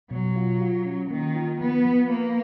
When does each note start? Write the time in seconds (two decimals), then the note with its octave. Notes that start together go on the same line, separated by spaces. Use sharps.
0.11 B2 F#3
0.36 F4
0.61 F4
0.86 C#4
1.11 D#3 A#3
1.35 F4
1.61 F3 B3
1.85 F3
2.10 A#3 B4